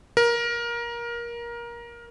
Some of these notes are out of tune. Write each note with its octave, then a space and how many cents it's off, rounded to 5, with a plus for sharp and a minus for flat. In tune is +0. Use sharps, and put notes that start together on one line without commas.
A#4 +20